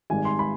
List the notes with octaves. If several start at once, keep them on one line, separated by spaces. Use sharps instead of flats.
G#1 G#2 D#3 G3 G#5
C6
B5